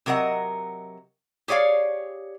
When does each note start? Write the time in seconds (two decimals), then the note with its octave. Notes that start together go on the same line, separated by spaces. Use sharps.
0.06 C3 F#3 A#4 D#5 F#5
1.48 G4 G#4 C#5 D5 F5